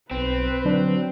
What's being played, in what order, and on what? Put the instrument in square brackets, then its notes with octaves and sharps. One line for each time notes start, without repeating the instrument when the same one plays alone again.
[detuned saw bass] B1 [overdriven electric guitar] C4 [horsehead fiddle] B4
[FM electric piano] D3 D4 [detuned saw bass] F#3